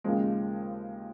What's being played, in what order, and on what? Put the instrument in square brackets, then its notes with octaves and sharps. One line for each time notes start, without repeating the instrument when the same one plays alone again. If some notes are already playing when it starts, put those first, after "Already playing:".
[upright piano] D#2 C#3 F3 G#3